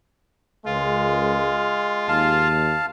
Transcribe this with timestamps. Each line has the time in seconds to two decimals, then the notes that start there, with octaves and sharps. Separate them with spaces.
0.66 C#2 G#3 F4 A#4
2.08 D#2 F5 A5